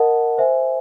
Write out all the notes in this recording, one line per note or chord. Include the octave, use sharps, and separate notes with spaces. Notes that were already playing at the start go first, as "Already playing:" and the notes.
Already playing: A#4 D#5 F#5 A5
C5 E5 G#5